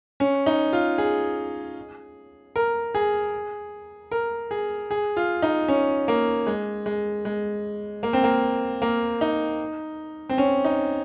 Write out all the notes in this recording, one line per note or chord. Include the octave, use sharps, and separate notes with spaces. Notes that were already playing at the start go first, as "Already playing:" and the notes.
C#4
D#4
F4
G#4
A#4
G#4
A#4
G#4
G#4
F4
D#4
C#4
A#3
G#3
G#3
G#3
A#3
C4
A#3
A#3
D#4
C4
C#4
D#4